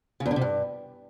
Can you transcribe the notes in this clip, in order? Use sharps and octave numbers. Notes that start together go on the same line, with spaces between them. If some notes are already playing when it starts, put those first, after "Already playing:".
C#3
E2
D3
C3
G2